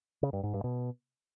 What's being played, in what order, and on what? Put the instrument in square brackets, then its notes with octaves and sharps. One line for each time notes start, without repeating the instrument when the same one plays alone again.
[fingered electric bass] C#3
G2
G#2
G2
B2